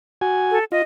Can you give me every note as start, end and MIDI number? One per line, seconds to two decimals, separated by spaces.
0.21 0.59 66
0.21 0.59 80
0.51 0.64 69
0.72 0.82 65
0.72 0.82 75